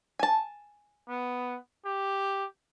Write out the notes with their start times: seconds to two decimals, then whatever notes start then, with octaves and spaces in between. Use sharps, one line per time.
0.19 G#5 A5
1.09 B3
1.85 G4